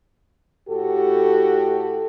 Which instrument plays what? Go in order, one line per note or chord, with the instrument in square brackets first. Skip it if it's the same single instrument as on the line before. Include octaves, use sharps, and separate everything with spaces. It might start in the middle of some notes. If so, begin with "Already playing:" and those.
[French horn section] A2 F#4 G4 A4